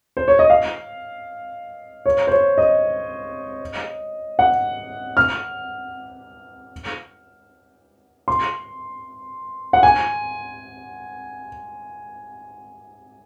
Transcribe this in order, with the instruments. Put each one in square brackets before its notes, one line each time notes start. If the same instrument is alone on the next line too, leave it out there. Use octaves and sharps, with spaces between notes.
[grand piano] C5
C#5
D#5
F5
C#5
C5
C#5
D#5
F#5
F6
C6
F#5
G#5